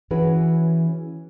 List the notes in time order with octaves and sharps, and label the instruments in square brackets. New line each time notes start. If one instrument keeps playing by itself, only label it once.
[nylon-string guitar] E3 C#4 F#4 G#4 B4